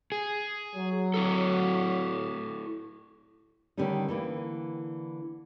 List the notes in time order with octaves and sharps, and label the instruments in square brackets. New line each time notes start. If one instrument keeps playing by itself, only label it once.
[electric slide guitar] G#4
[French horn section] F#3
[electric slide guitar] E4 F#4 A4
[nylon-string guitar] D3 D#3 G3 C#4 D#4
D3 E3 A#3